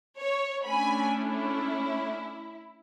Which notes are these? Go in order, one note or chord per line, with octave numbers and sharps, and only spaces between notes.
C#5
A3 C#4 D4 G#5 B5
E4